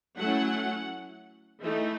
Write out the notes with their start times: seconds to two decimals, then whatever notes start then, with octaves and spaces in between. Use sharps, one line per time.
0.17 F#3 A3 C#4 E4 F#5
1.61 E3 A3 D#4